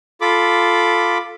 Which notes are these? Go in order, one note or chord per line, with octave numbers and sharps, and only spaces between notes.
F4 A4 B5 D6